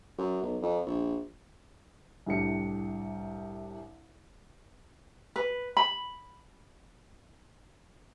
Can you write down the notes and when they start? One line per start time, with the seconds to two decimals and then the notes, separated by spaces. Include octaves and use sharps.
0.18 F#2
0.42 B1
0.62 F2
0.86 A#1
2.26 C2 A2 G3 D4 C#7
5.36 B4
5.77 B5